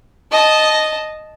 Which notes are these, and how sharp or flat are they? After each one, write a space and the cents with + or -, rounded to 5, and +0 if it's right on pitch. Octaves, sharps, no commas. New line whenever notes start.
D#5 -5 A5 -15